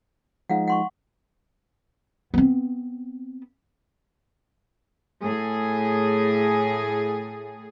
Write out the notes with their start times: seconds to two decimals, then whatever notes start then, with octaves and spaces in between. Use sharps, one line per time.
0.49 F3 G#3 D#4 F5 F#5
0.68 F#5 C6 C#6
2.34 B3 C4
5.23 A2 G#4